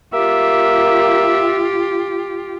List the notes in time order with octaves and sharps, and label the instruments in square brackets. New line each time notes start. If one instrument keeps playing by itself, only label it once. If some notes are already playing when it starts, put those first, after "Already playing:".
[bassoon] A#3 [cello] F4 G4 [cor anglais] E5